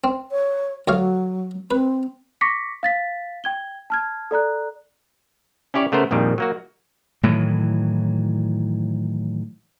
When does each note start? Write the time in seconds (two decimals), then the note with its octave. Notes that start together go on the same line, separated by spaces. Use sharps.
0.04 C4
0.31 C#5
0.88 D2 F#3 C#5 F5
1.71 C4 B4
2.41 C#6 D6 A#6 B6 C#7
2.83 F5 A6 B6
3.44 G5 G#6 G7
3.90 A5 F6 G#6
4.31 A4 D5 A#5 F#6
5.74 C#4 E4 G4 C#5 D5
5.92 C#3 A3 B3 A#4 C5
6.11 A#1 F2 A#2 D#3 G3
6.38 F#3 A#3 F#4
7.23 A2 D#3 E3 F#3